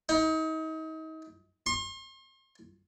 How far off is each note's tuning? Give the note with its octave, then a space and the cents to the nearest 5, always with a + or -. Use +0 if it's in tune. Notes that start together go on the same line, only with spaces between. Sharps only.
D#4 +35
C6 +40